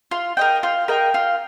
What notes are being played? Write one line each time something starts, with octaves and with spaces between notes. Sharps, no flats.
F4
A#4 D#5 G5
F4
A#4 D#5 G5
F4